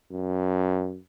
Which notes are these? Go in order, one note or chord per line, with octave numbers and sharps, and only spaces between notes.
F#2